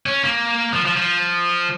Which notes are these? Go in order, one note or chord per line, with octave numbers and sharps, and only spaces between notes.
C#4
A#3
F3
F3
F3